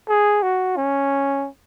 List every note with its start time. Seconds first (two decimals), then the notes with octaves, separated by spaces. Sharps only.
0.09 G#4
0.43 F#4
0.77 C#4